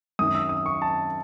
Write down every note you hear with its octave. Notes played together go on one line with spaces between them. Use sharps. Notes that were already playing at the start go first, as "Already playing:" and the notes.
F#2 D#3 D#6
E6
D#6
C#6
A5